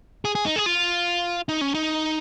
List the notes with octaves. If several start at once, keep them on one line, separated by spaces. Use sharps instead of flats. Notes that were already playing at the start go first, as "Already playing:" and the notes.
G#4
G#4
D#4
G#4
F4
D#4
C#4
D#4